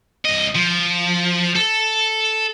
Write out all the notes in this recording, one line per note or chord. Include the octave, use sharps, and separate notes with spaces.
C2 D#5
F3
A4